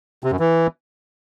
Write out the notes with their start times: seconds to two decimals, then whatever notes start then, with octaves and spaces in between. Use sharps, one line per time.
0.24 C3
0.32 F#2
0.39 E3